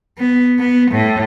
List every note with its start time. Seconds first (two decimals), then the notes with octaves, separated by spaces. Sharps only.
0.19 B3
0.59 B3
0.92 A2